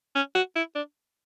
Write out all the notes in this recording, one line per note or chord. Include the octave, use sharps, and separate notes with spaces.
C#4
F#4
E4
D4